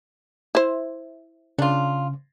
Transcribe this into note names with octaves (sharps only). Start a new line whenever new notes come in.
E4 C5
C#3 D4 F4